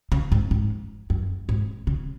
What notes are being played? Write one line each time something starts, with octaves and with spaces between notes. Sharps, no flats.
C#3
G#2
G#2
F#2
G#2
C#3